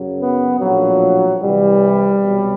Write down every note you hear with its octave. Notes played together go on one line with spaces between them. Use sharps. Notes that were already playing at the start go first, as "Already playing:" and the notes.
Already playing: F#2 C#3 F#3
B3
A#1 A2 F3 F#3
C2 C3 E3 G3
C2 B2 F#3